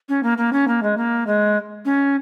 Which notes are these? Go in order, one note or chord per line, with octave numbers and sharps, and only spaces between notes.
C#4
A#3
A#3
C#4
A#3
G#3
A#3
G#3
C#4